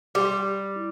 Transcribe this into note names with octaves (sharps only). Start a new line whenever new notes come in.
G3 G4 D5 G5 C6
E4